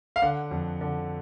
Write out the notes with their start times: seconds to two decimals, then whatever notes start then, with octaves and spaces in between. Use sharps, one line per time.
0.16 F5
0.22 D3 F#5
0.51 F2
0.81 D3